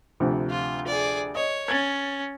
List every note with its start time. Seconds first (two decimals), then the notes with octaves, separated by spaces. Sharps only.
0.20 D2 C3 F3
0.50 F4
0.87 G#4 D5
1.35 C#5 D#5
1.68 C#4 G#6 A6